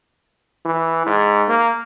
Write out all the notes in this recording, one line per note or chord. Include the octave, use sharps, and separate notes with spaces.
E3
G#2
A#3